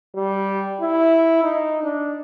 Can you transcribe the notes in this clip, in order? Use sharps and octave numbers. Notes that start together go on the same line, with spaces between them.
G3
E4
D#4
D4